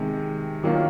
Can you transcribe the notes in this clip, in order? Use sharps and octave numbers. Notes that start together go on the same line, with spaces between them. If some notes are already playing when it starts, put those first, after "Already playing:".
Already playing: C3 D#3 G#3
D#3 F#3 A#3 D4 F4